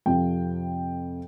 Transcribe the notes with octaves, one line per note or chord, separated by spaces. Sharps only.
F2 C3 F3 G5